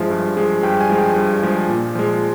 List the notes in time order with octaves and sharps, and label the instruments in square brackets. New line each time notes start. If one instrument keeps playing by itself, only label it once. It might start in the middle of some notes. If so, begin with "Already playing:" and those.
Already playing: [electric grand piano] G2 F3 G#3 E5
G2
F3 G#3
G2 G5
G#5
F3 G#3
G5
G2
F3 G#3
A#2
F3 G#3